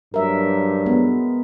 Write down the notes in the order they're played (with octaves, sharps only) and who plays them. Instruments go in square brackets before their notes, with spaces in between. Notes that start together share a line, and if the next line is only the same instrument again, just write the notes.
[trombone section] G2 F#3 [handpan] A#4 E5
[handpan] G#3 B3